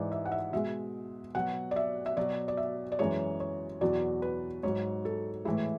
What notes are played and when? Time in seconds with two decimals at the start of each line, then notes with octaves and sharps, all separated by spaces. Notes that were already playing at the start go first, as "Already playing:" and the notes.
Already playing: G#2 E3 G#3 D5
0.12 E5
0.25 F#5
0.32 E5
0.53 B2 G#3 E5
1.35 B2 F#3 F#5
1.71 D5
1.76 E5
2.06 E5
2.17 B2 F#3 D5
2.48 D5
2.57 E5
2.92 D5
2.99 F#2 E3 G#3 C#5
3.40 C#5
3.81 E2 B2 F#3 D5
4.22 B4
4.63 G#2 F#3 C#5
5.05 A4
5.45 A2 E3 G#3 E4